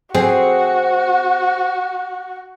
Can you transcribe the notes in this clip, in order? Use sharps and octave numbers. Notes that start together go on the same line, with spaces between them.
C4 F#4 G#4